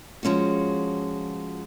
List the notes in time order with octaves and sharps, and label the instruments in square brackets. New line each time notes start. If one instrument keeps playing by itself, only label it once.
[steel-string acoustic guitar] F3 G#3 C#4 F4 F#4